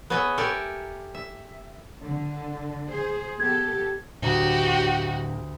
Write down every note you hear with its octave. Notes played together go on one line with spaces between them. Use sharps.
B3 G#4 C#5 D#5 E5
G4 A4 A#4 D5 E5 G#5
E5
D3
G#4 C5
B3 G4 A4 G#6
D2 A2 D3 F#3 F#4 G4 A#5